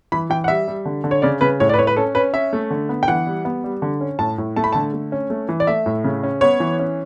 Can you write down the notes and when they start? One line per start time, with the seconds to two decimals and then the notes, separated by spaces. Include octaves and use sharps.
0.12 E3 B5
0.30 E3 G5
0.44 F#5
0.48 G3 E5
0.68 G3
0.86 D3
1.04 D3
1.11 C#5
1.22 C#3 D5
1.41 C#3 B4
1.60 A2 C#5
1.69 D5
1.74 B4
1.78 A2 C#5
1.87 B4
1.96 C#4 A4
2.15 C#4 B4
2.34 C#4 E5
2.53 A3
2.71 D3
2.89 B3
3.03 G5
3.08 E3 F#5
3.27 G3
3.45 B3
3.64 G3
3.82 D3
4.01 C#4
4.19 A2 A5
4.38 A2
4.56 A3 A5
4.64 B5
4.73 A5
4.75 D3
4.93 A3
5.12 C#4
5.30 A3
5.49 E3
5.60 D5
5.67 A3 E5
5.86 A2
6.04 C#3
6.23 C#4
6.41 B3 C#5
6.60 E3
6.79 C#4